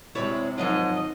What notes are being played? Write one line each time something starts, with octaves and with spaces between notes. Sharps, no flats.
C3 G#3 E4 C#5 D5
G#2 D#3 F3 F#3 D#5